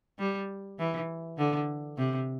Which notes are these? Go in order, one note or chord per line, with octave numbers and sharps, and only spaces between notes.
G3
E3
D3
C3